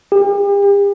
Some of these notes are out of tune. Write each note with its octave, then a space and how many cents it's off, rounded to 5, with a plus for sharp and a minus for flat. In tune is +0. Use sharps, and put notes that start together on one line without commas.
G4 +40